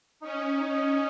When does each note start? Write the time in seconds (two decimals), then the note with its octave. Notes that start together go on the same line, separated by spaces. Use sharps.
0.21 C#4 D#4
0.60 D#4